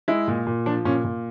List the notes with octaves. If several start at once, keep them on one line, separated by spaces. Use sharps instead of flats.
G#3 E4
A#2
A#2
F3 D4
A#2 C#4
A#2